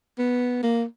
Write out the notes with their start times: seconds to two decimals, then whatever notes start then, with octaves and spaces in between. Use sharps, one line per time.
0.18 B3
0.63 A#3